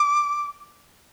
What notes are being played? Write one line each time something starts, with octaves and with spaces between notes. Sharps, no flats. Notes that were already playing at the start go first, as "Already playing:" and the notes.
Already playing: D6